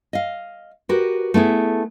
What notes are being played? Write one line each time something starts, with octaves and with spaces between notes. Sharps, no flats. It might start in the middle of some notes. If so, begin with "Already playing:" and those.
D#5 F5
F#4 G4 A#4 B4
A3 B3 E4 G#4